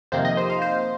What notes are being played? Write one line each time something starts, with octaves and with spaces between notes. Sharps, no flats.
F2 C3 D#3 A#3 C5
D#5
C5
F5
C5